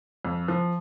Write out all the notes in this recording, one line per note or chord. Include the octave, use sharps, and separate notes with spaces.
F2
F3